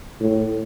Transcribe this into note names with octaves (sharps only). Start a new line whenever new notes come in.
A2